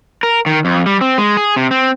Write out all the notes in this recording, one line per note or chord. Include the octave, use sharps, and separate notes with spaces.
A#4
D#3
F2
G3
C4
G#3
G#4
C3
C4